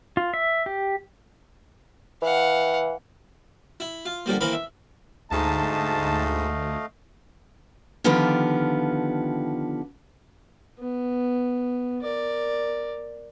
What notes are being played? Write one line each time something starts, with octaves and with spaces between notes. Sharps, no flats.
F4
E5
G4
E3 F5 F#5
E4
F4
D3 F3 G3 A#3
E3 A#3 C4 A#4 B5
E5
D2 G#2 A3 D#4 D#5 F5 A5
D3 D#3 F3 B3 F4 G4
B3
A#4 D5